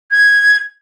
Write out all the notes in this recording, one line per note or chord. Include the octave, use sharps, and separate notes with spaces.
G#6